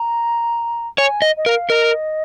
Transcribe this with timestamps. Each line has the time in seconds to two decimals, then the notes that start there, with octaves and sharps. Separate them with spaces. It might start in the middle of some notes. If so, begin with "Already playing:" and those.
Already playing: A#5
0.98 C#5 G#5
1.22 D#5
1.37 D#5
1.46 A#4 F5
1.70 A#4 D#5